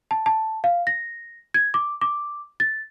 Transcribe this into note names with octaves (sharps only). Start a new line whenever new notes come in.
A5
A5
F5
A#6
G#6
D6
D6
A6